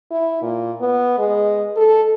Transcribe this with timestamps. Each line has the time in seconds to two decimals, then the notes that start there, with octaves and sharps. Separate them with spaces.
0.11 E4
0.42 A#2
0.80 B3
1.18 G#3
1.77 A4